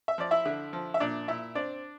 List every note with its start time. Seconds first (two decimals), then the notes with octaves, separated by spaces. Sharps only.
0.08 E5
0.18 F3 D5
0.31 E4 E5
0.46 D3
0.73 F3
0.94 E5
1.00 A#2 D4 D5
1.28 A#2 E4 E5
1.55 C4 D4 D5